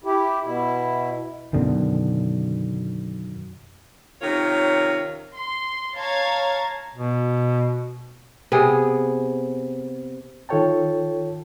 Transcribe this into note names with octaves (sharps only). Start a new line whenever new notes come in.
E4 G4
B2 E4
F#2 B2 D3 D#3
C3 D#3 C#4 F4 A#4 C#5
C6
C#5 F5 A5 A#5 G#6
B2
C3 B3 G#4
D#3 F4 A4 C#5 G5 A5